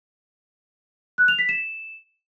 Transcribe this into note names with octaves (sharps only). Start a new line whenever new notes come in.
F#6
F7
B6
E7